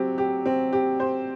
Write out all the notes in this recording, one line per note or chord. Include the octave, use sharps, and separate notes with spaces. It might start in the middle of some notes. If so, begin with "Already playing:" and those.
Already playing: F#3 C4 G4
G4
C4
G4
C5